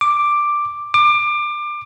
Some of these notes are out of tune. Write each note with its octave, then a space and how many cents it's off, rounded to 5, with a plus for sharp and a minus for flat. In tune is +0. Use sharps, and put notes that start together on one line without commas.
D6 +5
D6 +25